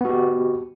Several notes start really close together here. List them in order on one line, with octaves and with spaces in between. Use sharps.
B3 F#4 G4